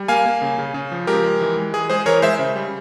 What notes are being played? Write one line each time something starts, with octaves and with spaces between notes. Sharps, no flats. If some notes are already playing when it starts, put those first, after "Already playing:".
Already playing: G3
A#3 F5 G#5
A#3
C#3
C#3
C#3
F3
G#3 G4 A#4
G#3
E3
G#3
E3 G#4
G#3 G#4 C5
E3 A#4 C#5
G#3 C5 E5
C#3
G3